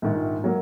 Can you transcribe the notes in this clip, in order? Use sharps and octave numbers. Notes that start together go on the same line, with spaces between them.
A#1 G#2 D#3
F#3 A#3